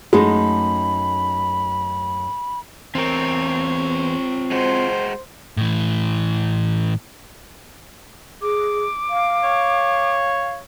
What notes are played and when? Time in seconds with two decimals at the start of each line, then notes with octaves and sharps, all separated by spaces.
0.13 F#2 G#3 A3 D#4 B5
2.95 E2 C4 F4 A#4 C#5
4.51 G#3 F#4 C5
5.57 A2 E3
8.42 G#4 D6
9.10 F5
9.43 C#5